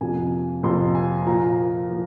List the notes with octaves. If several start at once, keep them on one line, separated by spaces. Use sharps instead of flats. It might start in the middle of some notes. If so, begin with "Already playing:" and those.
F2 C3 F3 A#3 G#5
F2 C3 F3 A#3 C6
G#5
A#2 F3 A#3 A#5
A#2 F3